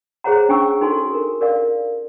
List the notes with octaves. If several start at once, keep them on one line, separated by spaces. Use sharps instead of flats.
G#4 C5 C#5 F#5 A#5
C#4 D4 G5 G#5 C#6 E6
D#4 F#4 A4 G#5 C6
A4 A#4
A#4 D5 F5